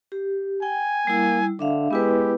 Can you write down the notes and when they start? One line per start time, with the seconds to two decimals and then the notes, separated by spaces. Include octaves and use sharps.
0.12 G4
0.62 G5 G#5
1.07 G3 A#3 E4
1.59 D3 D4 E5 F5
1.91 G#3 B3 E4 G4 B4